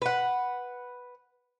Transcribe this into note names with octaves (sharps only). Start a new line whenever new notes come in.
B4 F#5